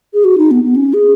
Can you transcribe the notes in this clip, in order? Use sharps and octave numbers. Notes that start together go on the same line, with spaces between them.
G#4
F#4
D#4
B3
B3
C#4
G#4